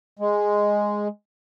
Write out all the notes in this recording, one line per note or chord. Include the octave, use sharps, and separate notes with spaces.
G#3